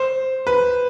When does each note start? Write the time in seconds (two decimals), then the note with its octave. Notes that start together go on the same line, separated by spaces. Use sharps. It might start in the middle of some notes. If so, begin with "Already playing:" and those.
Already playing: C5
0.47 B4